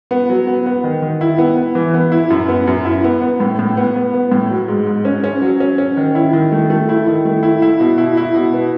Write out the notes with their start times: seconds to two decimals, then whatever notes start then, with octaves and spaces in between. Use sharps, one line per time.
0.11 B3
0.29 F#3
0.47 B3
0.66 B3
0.84 D#3
1.02 D#3
1.21 E4
1.38 B3
1.57 B3
1.75 E3
1.94 B3
2.12 E4
2.30 F#2
2.48 B3
2.67 F#2
2.85 E4
3.04 B3
3.22 B3
3.40 A2
3.59 A2
3.77 B3
3.95 B3
4.14 B3
4.32 A2
4.50 F#3
4.68 G#2
4.87 G#2
5.05 C#4
5.24 C#4
5.42 F#3
5.60 C#4
5.78 C#4
5.97 D#3
6.15 E4
6.33 D#3
6.52 A3
6.70 A3
6.89 E4
7.07 D#3
7.25 A3
7.43 E4
7.62 E4
7.80 B2
7.98 E4
8.17 E4
8.35 B2
8.53 B3